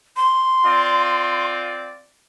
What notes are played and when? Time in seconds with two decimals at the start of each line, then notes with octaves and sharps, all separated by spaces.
0.16 C6
0.65 C4 F4 D5